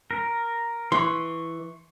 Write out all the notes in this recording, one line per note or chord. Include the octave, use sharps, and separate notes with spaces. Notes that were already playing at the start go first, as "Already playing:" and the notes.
A#4
E3 C6 C#6